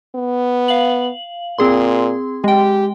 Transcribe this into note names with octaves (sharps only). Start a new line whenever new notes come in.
B3
F5 F#7
A#2 C4 G#4 C6
G#3 G4 G5